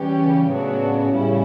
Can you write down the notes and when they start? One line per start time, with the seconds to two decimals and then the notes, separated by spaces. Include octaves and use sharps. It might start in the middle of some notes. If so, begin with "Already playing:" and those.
Already playing: E3 G3 C#4 G4 B4
0.19 C#3
0.49 A2 F#3 B3 D4 F#4
1.13 A2 G3 C#4 E4